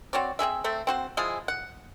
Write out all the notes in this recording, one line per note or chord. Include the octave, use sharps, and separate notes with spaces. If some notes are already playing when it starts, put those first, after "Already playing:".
C4 F#4 C#5 D5
C4 C#4 G#4 E5
A3 C4 E5
C4 F#4 C5
F3 G#3 E4 G#4
F#5